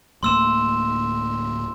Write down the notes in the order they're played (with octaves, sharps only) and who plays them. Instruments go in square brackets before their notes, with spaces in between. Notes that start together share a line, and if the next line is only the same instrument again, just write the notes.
[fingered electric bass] D1 A3 A#3 [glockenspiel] C6 E6 E7